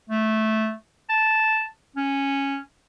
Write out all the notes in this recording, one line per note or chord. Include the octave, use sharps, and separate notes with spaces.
A3
A5
C#4